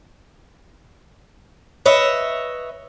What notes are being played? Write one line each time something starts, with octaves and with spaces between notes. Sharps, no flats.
B4 C#5 D#5 E5